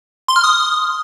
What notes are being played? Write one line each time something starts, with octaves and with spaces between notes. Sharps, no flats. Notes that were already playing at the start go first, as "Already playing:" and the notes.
C6
F6
D#6